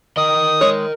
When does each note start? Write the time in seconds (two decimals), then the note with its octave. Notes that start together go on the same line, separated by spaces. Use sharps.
0.17 A#4 D#5 D#6
0.61 G#3 C#5